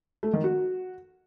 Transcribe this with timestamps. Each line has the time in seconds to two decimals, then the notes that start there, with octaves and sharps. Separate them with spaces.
0.23 A3
0.33 D#3
0.44 F#4